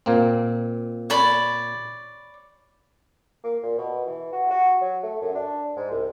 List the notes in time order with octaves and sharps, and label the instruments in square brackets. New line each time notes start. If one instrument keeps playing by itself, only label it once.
[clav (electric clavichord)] A#2 A#3 C4
[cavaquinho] C#5 D5 B5
[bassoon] A#3
A#2
B2
E3
F#4
F#4
F#3
A3
F#2
D4
G#2
C2